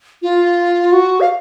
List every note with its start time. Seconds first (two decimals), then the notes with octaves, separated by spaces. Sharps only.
0.22 F4
0.92 F#4
1.21 F5